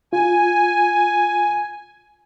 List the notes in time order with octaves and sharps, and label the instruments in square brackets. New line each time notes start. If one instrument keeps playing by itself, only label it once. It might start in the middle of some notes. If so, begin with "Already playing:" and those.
[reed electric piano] F4 [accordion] G#5